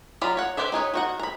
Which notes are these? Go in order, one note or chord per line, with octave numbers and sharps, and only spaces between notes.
F#3 F4 D5 A#5 B5
C#5 F#5
G4 B4 C5 D5 E5
D#4 G#4 B4 C#5
D#3 F#4 F#5
A#5 B5